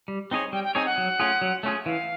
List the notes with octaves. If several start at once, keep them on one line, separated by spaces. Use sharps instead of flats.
G3
C4 D#4 G#4 C#5
G3 G5
G5
C4 D#4 G#4 C#5 G#5
F#5
F#3
A3 C#4 F4 G#4
F#3
A3 C#4 F4 G#4
E3 F5